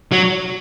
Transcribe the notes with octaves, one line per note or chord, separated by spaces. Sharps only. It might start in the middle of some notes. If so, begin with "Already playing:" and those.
F#3